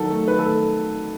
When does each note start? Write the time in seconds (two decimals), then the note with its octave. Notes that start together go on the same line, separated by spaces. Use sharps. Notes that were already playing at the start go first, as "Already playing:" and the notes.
Already playing: D#3 F#3 A4
0.10 A3
0.27 D#3 B4
0.38 A4
0.44 A3